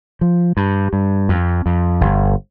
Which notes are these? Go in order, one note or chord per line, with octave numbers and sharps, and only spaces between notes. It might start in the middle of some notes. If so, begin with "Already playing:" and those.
F3
G2
G2
F2
F2
G1